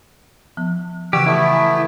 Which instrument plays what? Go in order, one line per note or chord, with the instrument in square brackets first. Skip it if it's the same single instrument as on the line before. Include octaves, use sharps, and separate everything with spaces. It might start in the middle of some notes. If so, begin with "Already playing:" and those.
[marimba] F3 B3
[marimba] C#3 E3 G#6 [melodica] F#4 E6 [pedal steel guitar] G4
[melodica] A3 B3 [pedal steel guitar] E4
[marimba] G#5 A#5